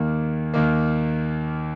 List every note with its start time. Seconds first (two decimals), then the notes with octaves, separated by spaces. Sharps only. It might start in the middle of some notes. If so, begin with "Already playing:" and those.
Already playing: D#2 D#3 A#3
0.54 D#2 D#3 A#3